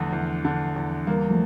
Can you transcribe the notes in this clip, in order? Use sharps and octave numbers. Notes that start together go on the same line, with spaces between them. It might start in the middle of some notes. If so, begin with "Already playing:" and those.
Already playing: E2 D3 F3 A3
E2
D3
E2
E3 G3 A#3
F3 A3